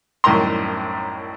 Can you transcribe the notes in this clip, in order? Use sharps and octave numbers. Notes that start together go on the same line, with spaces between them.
C2 F#2 A2 D#3 A#5 C6